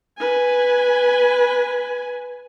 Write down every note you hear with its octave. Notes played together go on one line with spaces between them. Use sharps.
B4 G#5